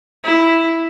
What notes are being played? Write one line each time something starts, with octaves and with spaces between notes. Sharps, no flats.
E4